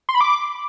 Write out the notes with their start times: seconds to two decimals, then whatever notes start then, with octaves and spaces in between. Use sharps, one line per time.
0.09 C6
0.15 B5
0.21 D6